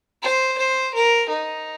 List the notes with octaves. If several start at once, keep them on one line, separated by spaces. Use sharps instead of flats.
C5
C5
A#4
D#4